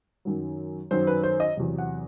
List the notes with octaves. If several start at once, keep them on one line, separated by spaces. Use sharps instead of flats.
F#2 D#3 F#3
F#2 D#3 F#3 C5
B4
C5
D#5
E2 C3 F#3
F#5